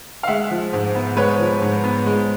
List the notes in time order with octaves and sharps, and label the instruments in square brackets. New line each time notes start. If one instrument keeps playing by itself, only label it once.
[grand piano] F5
G#3 E5 F#5
F3
G#2
B3
G#3 B4 C#5
F3
G#2
B3
G#3